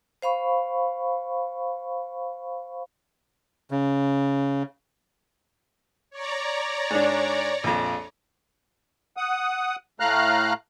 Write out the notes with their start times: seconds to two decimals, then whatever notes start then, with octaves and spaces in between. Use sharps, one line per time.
0.22 C5 F5 B5 C#6
3.71 C#3
6.10 C#5 D5 A#5
6.90 G#2 D4
7.64 A#1 F2
9.17 F#5 D#6
10.00 A2 A3 F5 A#5 F6 F#6